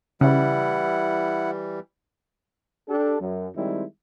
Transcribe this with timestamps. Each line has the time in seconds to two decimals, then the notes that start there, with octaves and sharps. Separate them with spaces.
0.21 C#3 E3 G3 E4 F#5
2.89 D4 G4 A4
3.20 F#2
3.55 D#3 G3 G#3 C4 D#4 E4